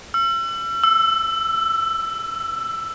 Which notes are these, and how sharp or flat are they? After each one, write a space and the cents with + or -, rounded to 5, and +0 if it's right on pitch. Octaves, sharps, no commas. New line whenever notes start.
E6 +40
E6 +10